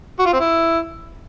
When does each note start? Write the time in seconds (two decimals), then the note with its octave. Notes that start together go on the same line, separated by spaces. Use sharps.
0.19 F#4
0.26 F4
0.33 C4
0.40 E4